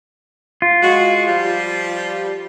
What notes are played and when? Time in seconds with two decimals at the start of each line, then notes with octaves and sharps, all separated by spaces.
0.62 F4
0.82 G#3 F#4
1.27 F3 G3 G4